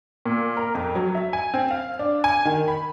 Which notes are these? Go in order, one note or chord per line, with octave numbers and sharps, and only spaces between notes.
A#2
A#4
F2
F#3
E5
G#5
C4
F5
D4
G#5
D#3
B5